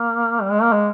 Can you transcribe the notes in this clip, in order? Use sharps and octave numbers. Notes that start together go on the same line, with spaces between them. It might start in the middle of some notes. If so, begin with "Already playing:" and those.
Already playing: A#3
G3
G#3
A#3
G#3